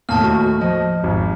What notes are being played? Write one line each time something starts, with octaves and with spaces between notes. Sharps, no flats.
D#2 A2 A#3 A5 F6
F#4
F3 D#5
G#1